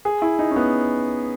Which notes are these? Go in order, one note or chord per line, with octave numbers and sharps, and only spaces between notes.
G#4
E4
D#4
C#4
B3